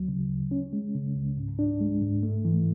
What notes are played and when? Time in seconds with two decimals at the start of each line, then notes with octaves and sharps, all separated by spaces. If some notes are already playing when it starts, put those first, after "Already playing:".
Already playing: D2 F#3
0.08 C#3
0.30 D2
0.51 C#4
0.73 G#3
0.95 C#3
1.16 C#2
1.37 G#2
1.59 D4
1.80 G#3
2.02 G#2
2.23 A3
2.45 E3